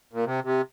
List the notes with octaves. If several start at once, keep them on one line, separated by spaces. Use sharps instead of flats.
A#2
C3
C3